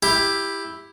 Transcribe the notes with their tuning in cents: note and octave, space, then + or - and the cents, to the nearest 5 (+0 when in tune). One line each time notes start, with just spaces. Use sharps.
E4 +0 G4 +10